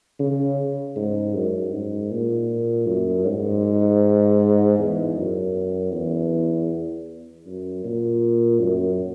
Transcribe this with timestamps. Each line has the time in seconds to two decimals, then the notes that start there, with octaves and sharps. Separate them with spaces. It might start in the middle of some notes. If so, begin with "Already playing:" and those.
0.19 C#3
0.96 G#2
1.34 F#2
1.73 G#2
2.11 A#2
2.87 F#2
3.25 G#2
4.78 E2
5.17 F#2
5.93 E2
7.46 F#2
7.84 A#2
8.60 F#2